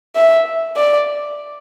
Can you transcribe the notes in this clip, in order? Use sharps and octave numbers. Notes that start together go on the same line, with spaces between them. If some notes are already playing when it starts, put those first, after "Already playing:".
E5
D5